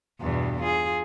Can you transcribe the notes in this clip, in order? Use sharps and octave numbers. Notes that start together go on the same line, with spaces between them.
E2 G2 B2
F4 G#4